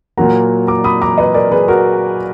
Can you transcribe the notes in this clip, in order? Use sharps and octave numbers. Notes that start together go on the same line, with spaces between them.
A#2 F#3 A#3 F#5 A#5
A#5 D6
B5 D#6
A#5 D6
B4 D#5
A#4 D5
G#4 B4
F#4 A#4